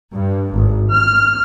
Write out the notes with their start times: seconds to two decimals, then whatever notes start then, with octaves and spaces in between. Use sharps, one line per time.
0.14 G2
0.55 G#1
0.92 F6